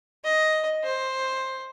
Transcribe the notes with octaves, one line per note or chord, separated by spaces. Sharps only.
D#5
C5